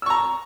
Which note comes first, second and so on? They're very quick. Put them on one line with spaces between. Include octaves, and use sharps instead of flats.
E6 C#6 A#5